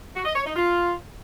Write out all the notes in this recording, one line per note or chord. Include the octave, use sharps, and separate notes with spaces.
F#4
D#5
C#5
D#4
F4